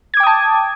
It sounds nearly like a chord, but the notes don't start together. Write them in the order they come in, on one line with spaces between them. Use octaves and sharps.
G#6 D6 G5 D#6 A5